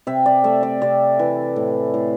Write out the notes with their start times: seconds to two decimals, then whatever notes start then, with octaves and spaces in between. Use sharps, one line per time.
0.07 C3 E5
0.26 D5
0.44 A3 E5
0.63 D5
0.81 C3 D5
1.19 E3
1.56 A2
1.94 A2